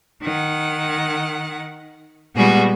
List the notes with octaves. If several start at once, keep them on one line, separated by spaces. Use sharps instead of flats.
D#3 F#5
A#2 G3 G#3 B3 F#4 G#4